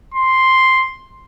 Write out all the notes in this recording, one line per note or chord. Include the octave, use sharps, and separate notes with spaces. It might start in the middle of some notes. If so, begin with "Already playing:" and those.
C6